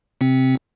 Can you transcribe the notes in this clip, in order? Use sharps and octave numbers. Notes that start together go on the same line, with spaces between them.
C3 C4